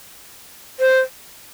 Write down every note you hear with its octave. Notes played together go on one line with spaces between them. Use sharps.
C5